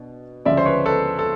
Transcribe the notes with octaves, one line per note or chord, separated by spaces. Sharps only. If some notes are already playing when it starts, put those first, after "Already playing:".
Already playing: B2 D4
D2 C#3 F3 G#3 C#4 D5 E5
C5
B4 C#5
A4 B4
A4